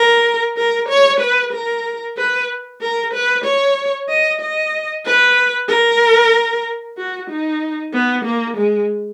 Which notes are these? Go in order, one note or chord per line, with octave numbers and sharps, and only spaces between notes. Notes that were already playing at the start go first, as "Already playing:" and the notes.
Already playing: A#4
A#4
C#5
B4
A#4
B4
A#4
B4
C#5
D#5
D#5
B4
A#4
F#4
D#4
B3
A#3
G#3